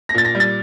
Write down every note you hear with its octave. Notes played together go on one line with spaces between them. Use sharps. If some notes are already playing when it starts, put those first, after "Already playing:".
A#6
A#2 A6
A#6
G3
A6